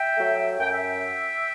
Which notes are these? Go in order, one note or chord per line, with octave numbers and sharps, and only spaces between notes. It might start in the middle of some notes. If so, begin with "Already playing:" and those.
Already playing: E5 G5
F#3 A3
F#2 G5
E5 G5